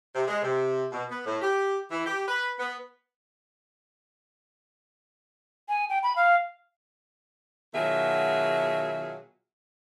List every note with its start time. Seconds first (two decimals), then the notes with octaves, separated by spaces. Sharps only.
0.15 C3
0.28 G#3
0.43 C3
0.92 B2
1.10 B3
1.26 A2
1.42 G4
1.90 E3
2.06 G4
2.28 B4
2.59 B3
5.69 G#5
5.90 G5
6.03 B5
6.16 F5
7.74 B2 D#3 F#3 F4 G#4 E5